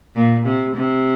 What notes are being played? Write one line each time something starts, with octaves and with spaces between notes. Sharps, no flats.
A#2
C3
C3